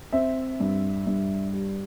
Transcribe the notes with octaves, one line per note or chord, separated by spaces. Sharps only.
C4 E5
G2
G2
G3